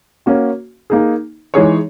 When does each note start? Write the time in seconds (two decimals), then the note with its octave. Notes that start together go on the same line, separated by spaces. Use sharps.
0.26 A#3 C#4 F#4
0.90 A#3 D#4 G#4
1.54 E3 G#3 D#4 G#4 C#5